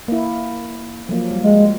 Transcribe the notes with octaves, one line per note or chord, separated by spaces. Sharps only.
A#3 E4
F3 F#3 A#3
G3
G#3